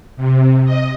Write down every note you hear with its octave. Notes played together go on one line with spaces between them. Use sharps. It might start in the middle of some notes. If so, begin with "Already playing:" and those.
C3
D#5